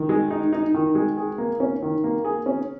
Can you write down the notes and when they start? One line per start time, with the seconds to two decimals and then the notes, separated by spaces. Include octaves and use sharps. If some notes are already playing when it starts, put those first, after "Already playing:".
Already playing: D#3
0.09 G#3
0.30 D#4
0.53 D#4
0.74 D#3
0.95 G#3
1.17 G#4
1.38 A#3
1.60 C#4
1.82 D#3
2.04 A#3
2.25 G#4
2.46 C#4